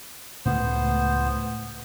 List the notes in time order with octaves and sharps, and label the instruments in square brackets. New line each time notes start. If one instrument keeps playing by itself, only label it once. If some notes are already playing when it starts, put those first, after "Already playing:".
[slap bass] C#2 A2 A3 [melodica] B3 C5